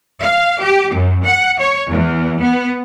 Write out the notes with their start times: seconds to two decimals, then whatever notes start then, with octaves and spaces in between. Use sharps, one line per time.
0.22 F5
0.61 G4
0.94 F#2
1.23 F#5
1.59 C#5
1.90 E2
2.40 B3